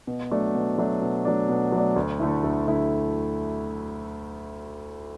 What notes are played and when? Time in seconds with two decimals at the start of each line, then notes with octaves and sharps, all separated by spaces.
0.07 B2
0.31 F#3 A3 D4
0.55 B2
0.78 F#3 A3 D4
1.02 B2
1.25 F#3 A3 D4
1.49 B2
1.72 F#3 A3 D4
1.96 D2
2.20 D3 A3 E4
2.44 D2
2.67 D3 A3 E4